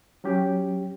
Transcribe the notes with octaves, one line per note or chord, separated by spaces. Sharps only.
F#3 C#4 G4